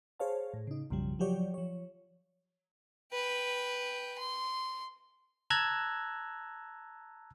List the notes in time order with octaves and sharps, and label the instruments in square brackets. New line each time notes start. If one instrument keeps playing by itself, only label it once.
[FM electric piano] G#4 C5 C#5 F5 A5
A2
C#3 D#4
B1 F#2 C#3 F3 G3
F3 F#3 G4 C#5 D5
F3 C#5
[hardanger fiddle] B4 G5
C6
[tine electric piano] A5 A#5 E6 F#6 G#6